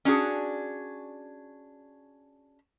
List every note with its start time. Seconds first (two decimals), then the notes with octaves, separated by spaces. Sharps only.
0.05 C#4 D4 F#4 G#4